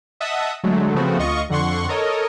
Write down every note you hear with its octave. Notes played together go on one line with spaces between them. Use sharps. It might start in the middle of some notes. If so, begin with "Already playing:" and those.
D#5 E5 F#5 A5 D#6
D3 F#3 G#3 A3
C#3 F3 A3 B3 C4 F#4
D2 F4 D#5 C#6
F2 D3 F#5 C6 C#6
A4 A#4 C#5 D#5